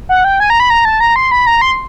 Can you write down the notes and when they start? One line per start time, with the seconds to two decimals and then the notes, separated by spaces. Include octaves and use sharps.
0.09 F#5
0.24 G5
0.40 G#5
0.50 A#5
0.60 B5
0.70 A#5
0.85 A5
1.00 A#5
1.16 C6
1.31 B5
1.47 A#5
1.61 C6